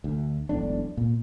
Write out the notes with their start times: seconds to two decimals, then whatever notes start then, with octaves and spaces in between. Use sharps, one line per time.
0.04 D2
0.49 E1 B1 A2 D4
0.97 A#2